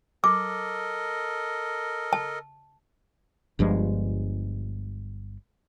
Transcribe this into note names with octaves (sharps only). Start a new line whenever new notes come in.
A4 A#4 D#5 D6
A5
G1 G2 F3 G#3